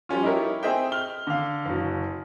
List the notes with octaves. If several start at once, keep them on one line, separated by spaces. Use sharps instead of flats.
F3 G3 C#4 F4
D#4 E4 G4 A#4 C#5
C4 G#4 D#5 E5 G5
F6 G7
D3 F5
F#1 B2